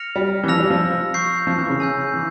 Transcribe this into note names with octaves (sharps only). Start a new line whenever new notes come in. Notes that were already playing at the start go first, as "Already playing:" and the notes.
Already playing: F6 A#6 C#7 F7
G3
E3
F3 E6 A#6 F7
G3
F3
C#6 G6 C7
F3
E3
C#3
G#5 E6 G6
E3